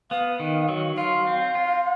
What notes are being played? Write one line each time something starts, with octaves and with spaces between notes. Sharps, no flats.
B3 F5
D#3
F#3
F4 F5
C4
F4